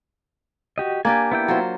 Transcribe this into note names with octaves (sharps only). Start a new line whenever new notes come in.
F#4 G4 D#5
A#3 D4 G4 G#5
B3 E4 G5
F#3 F4 C5